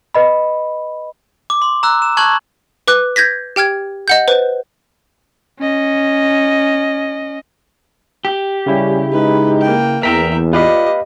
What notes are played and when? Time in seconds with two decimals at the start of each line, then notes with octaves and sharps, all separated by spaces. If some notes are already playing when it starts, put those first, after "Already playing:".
0.14 B4 D#5 B5
1.50 D6
1.62 C6
1.83 A#5 E6 F#6
2.02 E7
2.17 A5 C#6 F#6 G#6 F#7
2.88 B4 D6 F#6
3.16 G6 G#6 A#6 B6
3.56 G4 G5 F6 G#6
4.08 D#5 F#5 G6
4.28 B4 C5
5.59 C#4 D#5
8.25 G4
8.66 C#3 G3 C#4 E4
9.12 G#3 D#4 B4
9.62 A#3 G5
10.03 E2 A#4 E5 G5 A#5 B6
10.53 F4 G4 B4 D5 D#5 F5 B5